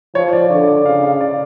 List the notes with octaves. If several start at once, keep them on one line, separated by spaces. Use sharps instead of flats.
F3 C#5
D5
D3 D5
D5
C#3 F5
F5
D5